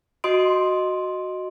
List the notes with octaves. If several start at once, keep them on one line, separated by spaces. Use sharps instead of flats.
F#4 D#5 C6 D#6 D7